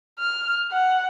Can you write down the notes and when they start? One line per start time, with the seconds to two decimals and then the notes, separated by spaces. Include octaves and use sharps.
0.19 F6
0.72 F#5